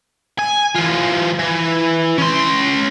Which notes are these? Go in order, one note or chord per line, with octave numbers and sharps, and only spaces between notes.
G#5
E3 F4
E3
C#4 C6